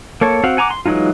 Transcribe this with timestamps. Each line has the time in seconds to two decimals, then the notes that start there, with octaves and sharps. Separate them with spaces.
0.21 A#3 A4 C#5
0.44 C4 F#4 F5 F#5
0.57 F#5 G#5 A#5 C#6 D6
0.70 C6
0.86 E3 F#3 G#3 D#4 F4